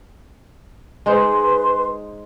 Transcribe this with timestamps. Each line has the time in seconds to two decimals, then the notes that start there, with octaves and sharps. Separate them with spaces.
1.06 G#3 D#4 B4 C5 C6